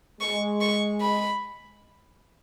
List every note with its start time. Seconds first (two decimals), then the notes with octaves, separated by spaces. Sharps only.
0.21 G#3 C#6
0.61 C#6
1.01 B5